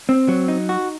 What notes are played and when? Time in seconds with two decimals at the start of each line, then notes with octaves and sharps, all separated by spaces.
0.09 C4
0.28 F#3
0.48 D#4
0.69 F#4